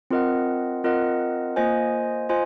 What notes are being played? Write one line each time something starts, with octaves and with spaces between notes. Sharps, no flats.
C4 F4 A#4 D#5 F#5
C4 F4 A#4 D#5 F#5
A#3 F4 C5 D#5 G#5
F4 C5 D#5 G#5